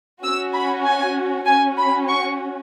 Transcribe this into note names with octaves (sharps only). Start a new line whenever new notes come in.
C#4 F#4 E6
B5
G#5
C#4 F#4 G#5
B5
C#6